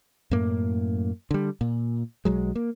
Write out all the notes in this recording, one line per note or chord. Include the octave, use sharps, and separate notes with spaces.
F#2 A2 A#3
D3 G3
A#2
B1 F#3 G#3
A#3